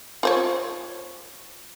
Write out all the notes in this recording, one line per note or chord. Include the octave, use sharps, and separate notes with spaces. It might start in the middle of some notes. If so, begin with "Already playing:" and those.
F4 C5 C#5